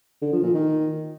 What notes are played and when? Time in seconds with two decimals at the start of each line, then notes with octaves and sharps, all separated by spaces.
0.22 D3
0.32 F3
0.43 A#2
0.54 D#3